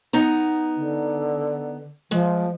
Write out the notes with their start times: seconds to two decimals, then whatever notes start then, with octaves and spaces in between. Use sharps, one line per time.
0.13 B3 D#4 A#5
0.77 D3
2.11 F3 G#3